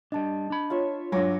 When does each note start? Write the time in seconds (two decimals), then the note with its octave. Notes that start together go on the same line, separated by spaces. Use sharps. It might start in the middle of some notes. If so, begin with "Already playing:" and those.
0.12 G3 D4 D#5 A5
0.50 D4 B5
0.70 F4 C#5 E5
1.12 G2 F#3 C#5 E5 G#5 D6 A#6